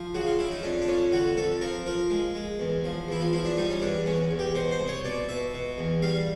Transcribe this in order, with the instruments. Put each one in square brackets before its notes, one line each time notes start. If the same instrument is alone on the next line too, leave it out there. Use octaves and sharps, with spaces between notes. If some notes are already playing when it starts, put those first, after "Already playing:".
Already playing: [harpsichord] F3
C#3 F#4
F4
C#3 E4
D#4
F2 D4
D4
F2 C#4
D3 F#4
F2 A4
F3 A#4
F3 A#4
G#3
G#3
E2
F3
E2 E4
F4
F3 E4
D4
G3 D#4
C#4
E2 D4
E2 C#4
E2
G4
B2 C5
C5
C2
C#5
B2 D5
B2 E5
B2
E2
G3 F5